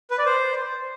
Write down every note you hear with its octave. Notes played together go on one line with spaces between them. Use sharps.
B4
D5
C5